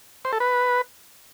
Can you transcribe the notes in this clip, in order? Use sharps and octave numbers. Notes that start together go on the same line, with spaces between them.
C5
A4
B4